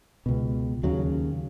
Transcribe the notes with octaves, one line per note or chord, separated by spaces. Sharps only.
C#2 B2
D#2 C#3 F#3